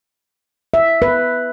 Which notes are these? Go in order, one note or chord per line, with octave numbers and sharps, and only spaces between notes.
E5
B4